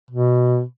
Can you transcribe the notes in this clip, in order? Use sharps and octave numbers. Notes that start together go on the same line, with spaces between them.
B2